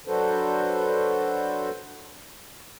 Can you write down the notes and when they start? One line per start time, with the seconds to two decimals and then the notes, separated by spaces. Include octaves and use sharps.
0.07 F#3 D4 F#4 A4 B4 C5